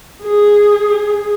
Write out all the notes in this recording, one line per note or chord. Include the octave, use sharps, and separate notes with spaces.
G#4